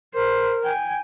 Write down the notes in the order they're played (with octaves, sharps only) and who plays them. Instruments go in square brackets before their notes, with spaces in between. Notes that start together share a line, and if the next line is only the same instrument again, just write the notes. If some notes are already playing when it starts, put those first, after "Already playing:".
[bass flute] A#4 [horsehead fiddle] C5
[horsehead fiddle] G5 G#5